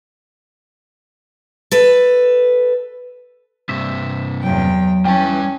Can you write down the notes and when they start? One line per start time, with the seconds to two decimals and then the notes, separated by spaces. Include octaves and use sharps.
1.71 A4 B4
3.69 G2 C3 E5
4.42 E2 F#3 G5
5.05 E3 G3 C#4 G5 A5